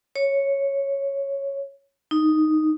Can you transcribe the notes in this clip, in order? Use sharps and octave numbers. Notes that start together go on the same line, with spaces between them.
C#5
D#4